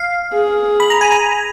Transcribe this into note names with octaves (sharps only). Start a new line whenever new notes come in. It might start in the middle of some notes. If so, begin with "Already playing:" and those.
Already playing: F5
G#4
B5
A#5
G#5
A#5